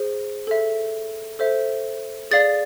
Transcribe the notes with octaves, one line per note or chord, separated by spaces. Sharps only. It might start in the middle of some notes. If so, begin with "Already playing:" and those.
Already playing: G#4 C5
A4 E5
A4 C5 E5
G#4 D5 F5 A6